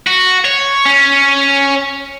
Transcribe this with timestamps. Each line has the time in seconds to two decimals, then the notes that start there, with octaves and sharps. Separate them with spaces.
0.07 F#4
0.45 C#5
0.85 C#4